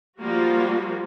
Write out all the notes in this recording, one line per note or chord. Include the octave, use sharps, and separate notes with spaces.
F3 G3 A#3 F4 F#4